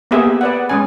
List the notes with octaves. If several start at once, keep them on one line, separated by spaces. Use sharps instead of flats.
A#3 B3 G4 G#4 E5
B4 D5 F#5
G#3 C#4 G#5